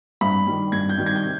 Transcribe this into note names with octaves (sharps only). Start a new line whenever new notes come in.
G2 B5
D#3 G3
G2 G#6
G6
D#3 G3
G#6
G6
C3